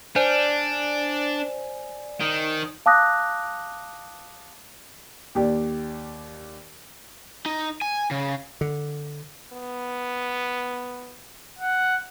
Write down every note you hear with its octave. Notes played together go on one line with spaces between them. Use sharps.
D4 C5 D5 G#5
D#3
F5 A5 D6 D#6 F#6 A#6
D#2 G4 D5
D#4
G#5
C#3
D3
B3
F#5